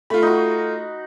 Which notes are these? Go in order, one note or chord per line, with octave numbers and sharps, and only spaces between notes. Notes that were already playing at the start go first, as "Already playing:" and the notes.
A3 F4 B5
D#4 F#4